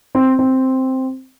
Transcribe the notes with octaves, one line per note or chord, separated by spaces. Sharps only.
C4
C4